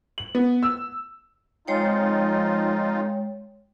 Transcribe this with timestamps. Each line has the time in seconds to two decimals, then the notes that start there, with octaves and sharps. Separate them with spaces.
0.18 F#7
0.35 B3
0.63 E6
1.68 F2 G#3 D#4 F4 C#5 G5